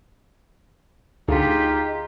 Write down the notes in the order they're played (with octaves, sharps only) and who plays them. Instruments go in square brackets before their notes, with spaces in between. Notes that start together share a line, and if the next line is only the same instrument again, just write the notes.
[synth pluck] D2 [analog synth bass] D#4 [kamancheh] F4 G4 [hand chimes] G#4 A#5 B6